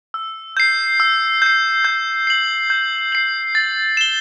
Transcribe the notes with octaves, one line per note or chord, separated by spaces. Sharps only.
E6
G6 C7
E6
G6 C7
G6
C7 F#7
G6
C7 F#7
A6
E7 G7